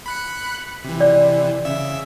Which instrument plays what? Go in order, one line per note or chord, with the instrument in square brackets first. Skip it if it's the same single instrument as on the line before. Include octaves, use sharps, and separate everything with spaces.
[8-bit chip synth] B5 F#6 C#7
C3 E3
[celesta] D5
[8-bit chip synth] C#3 E5 E6